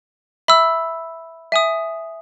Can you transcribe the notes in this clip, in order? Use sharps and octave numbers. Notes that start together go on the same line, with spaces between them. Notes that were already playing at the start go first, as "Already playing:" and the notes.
E5 B5 E6
E5 G#5 D#6